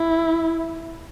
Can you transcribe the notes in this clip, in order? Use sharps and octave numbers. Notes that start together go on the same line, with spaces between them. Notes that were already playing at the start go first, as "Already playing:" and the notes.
Already playing: E4